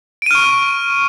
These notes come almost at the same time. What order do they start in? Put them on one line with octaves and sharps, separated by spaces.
D7 D#7 F6 C#6